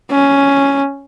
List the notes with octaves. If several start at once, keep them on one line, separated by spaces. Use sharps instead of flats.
C#4